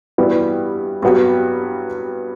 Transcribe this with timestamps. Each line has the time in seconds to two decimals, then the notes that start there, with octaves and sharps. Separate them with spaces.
0.18 G2 E3 G3 B3 F#4
1.02 G2 F#3 B3 F#4